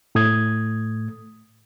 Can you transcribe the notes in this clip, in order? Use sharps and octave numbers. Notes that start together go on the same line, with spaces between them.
A2 A3 D#6 G#6